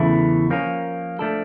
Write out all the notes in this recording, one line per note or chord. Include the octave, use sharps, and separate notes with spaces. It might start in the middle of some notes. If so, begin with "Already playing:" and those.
Already playing: E2 C#3 E3 A3 E4
F3 A#3 C#4
F3 A3 D4 A4